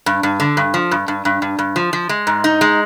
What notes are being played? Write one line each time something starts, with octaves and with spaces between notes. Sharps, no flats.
G2
G2
D3
G2
F3
G2
G2
G2
G2
G2
F3
F3
G#3
G#2
D#4
G#3